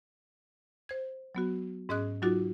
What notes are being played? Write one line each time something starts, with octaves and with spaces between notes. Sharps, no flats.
C5 G#6
F#3 B3 F#4
G#2 C#4 G#4 D#5 D#6 F#6
F#3 D#4 F4 F#4 D6 A6